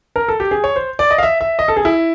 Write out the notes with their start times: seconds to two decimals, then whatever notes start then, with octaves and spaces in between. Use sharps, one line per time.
0.16 A#4
0.28 A4
0.40 G4
0.51 G#4
0.64 C#5
0.76 C5
0.99 D5
1.11 D#5
1.18 F5
1.23 E5
1.41 E5
1.59 D#5
1.68 A4
1.76 G#4
1.85 E4